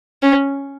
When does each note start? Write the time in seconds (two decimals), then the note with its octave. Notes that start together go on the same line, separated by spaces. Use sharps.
0.22 C#4